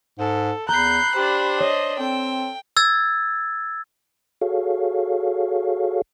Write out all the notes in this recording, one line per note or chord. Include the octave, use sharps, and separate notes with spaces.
G#2 A4
E2 A#5 B5 F#6 G6 C7
D4 G4 C5
C#5 D#5
C4 A4 G5
E6 G#6 A6
F#4 G#4 A4 C#5 F5